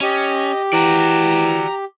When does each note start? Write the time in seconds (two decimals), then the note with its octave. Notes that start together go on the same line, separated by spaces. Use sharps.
0.01 C#4 G4 D#5
0.73 E3 F#4 D5 A#5